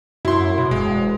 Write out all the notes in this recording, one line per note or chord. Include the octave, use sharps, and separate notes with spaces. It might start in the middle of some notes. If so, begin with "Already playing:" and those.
F#2 E4 F#4 C6
B2
E1 G#3